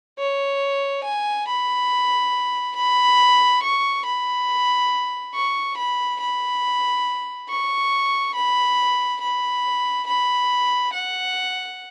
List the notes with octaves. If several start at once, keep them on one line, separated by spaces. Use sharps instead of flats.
C#5
G#5
B5
B5
C#6
B5
C#6
B5
B5
C#6
B5
B5
B5
F#5